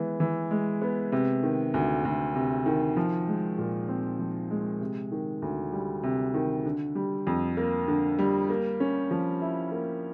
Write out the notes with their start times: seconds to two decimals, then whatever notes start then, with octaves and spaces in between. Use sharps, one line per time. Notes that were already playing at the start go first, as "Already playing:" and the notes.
Already playing: E3 G#3 B3
0.20 E3
0.51 G#3
0.82 B3
1.12 C3
1.43 D#3
1.74 D2
2.05 D2
2.35 C3
2.66 D#3
2.97 F3
3.28 G#3
3.58 A#2
3.88 C4
4.19 F3
4.50 G#3
4.81 C3
5.12 D#3
5.42 D2
5.72 G3
6.03 C3
6.34 D#3
6.66 D3
6.95 G3
7.27 F2
7.57 A#3
7.88 D3
8.19 G3
8.49 A#3
8.80 C#4
9.11 F3
9.42 E4
9.72 A#3